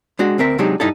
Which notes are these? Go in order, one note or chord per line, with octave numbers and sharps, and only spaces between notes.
G#3 D4 F#4
D2 C4 A#4 E5
C3 F#3 G#3 D4 D#4 G4
G2 D#4 E4 A4